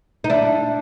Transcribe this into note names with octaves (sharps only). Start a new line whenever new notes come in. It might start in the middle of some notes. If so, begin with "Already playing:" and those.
D#4
D4 E4